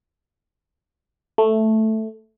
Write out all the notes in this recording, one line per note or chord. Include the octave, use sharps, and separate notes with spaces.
A3